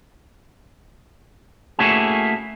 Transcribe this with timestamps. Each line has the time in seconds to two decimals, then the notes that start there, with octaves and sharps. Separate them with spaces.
1.79 A3 A#3 C#4 E4 F#4 G#4